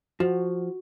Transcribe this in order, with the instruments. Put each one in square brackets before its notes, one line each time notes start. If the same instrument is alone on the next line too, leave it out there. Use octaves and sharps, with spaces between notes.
[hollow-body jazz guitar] F3 [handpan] F#4